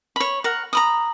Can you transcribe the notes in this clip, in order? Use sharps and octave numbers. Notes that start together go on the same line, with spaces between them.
C#5 B5
A#4 F#5
A#5 B5 D#6